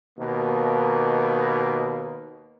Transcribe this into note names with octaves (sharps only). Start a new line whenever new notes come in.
D#2 B2 A#3